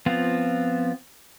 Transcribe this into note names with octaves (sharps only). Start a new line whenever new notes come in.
F3 B3 C4 F4